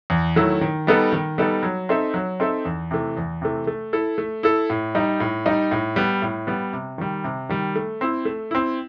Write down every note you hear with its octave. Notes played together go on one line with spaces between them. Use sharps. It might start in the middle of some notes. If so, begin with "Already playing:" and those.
E2
D#3 F#3 A3 E4
D#3
G3 B3 D#4 A4
D#3
G3 B3 D#4 A4
F#3
C4 D#4 A4 E5
F#3
C4 D#4 A4 E5
E2
C3 E3 A3
E2
C3 E3 A3
A3
E4 A4
A3
E4 A4
A2
G3 D#4
A2
G3 D#4
A2
G3 B3
A2
G3 B3
C3
D#3 G3
C3
D#3 G3
A3
C4 E4
A3
C4 E4